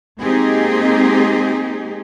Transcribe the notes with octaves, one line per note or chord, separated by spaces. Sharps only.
G#3 A#3 C4 D#4 G4 G#4